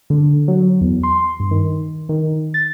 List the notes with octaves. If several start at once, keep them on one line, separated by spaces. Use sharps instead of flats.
D3
F#3
E2
C6
G2
D#3
D#3
A6